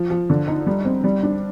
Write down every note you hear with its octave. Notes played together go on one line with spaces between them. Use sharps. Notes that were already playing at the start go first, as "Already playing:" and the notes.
Already playing: F3
F3
D3
D#4
G3
C4
G3
D4